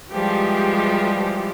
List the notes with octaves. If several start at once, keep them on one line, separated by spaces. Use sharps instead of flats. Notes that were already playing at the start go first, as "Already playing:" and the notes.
E3 F3 G3 G#3 G4